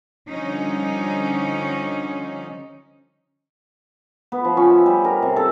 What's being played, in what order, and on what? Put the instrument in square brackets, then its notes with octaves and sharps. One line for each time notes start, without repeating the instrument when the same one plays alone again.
[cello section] D3 F3 G3 C#4 D#4
[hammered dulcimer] B3
F3
C#4
E5
G3
A#4
C3
A4